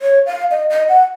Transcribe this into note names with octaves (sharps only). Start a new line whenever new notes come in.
C#5
F5
D#5
D#5
F#5